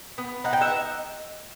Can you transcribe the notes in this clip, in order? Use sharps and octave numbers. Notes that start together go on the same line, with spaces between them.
B3
D#4 F#5
G5
E5 F#5